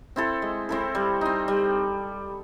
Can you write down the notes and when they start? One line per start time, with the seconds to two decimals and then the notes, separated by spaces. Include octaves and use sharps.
0.16 C4 E4 A4
0.42 G#3
0.69 C4 E4 A4
0.95 G3
1.21 C4 D#4
1.48 G3